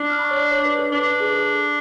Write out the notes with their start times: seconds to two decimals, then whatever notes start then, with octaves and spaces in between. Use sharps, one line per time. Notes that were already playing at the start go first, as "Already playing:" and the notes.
Already playing: D4
0.10 F6
0.19 B5
0.24 C#6
0.31 C#5
0.37 D5
0.51 C#5
0.65 B4
0.79 A4
0.92 D4 B4
1.06 B4
1.20 G#4
1.34 A4